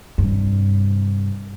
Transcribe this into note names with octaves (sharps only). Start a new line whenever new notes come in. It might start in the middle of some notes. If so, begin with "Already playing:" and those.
G2 C3